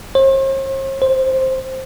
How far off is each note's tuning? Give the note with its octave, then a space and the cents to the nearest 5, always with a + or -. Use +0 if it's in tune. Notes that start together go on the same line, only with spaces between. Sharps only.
C5 +45
C5 +5